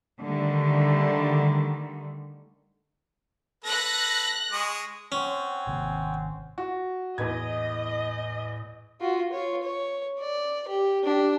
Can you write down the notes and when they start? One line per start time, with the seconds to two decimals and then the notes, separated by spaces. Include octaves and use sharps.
0.22 D3 D#3 G3 A3
3.64 A4 B4 F#6 A#6
4.52 G#3 C#6 D#6
5.12 C4 C#4 F#5 G#5
5.67 G#1 C3 D#3
6.58 F#4
7.18 E2 A2 B4 D#5 G#6
9.00 F4 F#4
9.32 F4 C#5
9.63 C#5
10.20 D5
10.68 G4
11.04 D4 G4